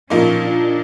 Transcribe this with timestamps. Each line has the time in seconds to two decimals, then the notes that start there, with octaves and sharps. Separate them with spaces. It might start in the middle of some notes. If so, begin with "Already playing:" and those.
0.10 A#2 F3 A#3 C#4 D#4
0.48 D4